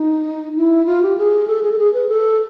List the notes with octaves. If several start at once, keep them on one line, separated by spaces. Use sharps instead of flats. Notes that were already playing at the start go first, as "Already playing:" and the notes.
Already playing: D#4
E4
F4
G4
G#4
A4
G#4
A4
G#4
B4
A4